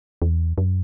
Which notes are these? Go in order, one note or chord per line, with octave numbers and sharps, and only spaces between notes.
E2
F#2